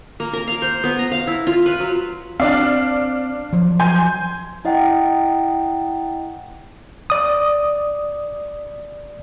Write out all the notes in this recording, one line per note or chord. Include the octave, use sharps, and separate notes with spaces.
A#3
A#4
F5
C5
B3
A#5
F5
E4
F4
B4
F#3
C4 D4 D5 F5
F3 F#3
G#5 C6 G6
E4 D#5 F#5 G5
D5 D#6